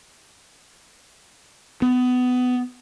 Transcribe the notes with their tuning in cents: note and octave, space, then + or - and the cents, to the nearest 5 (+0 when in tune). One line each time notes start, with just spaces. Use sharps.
B3 +20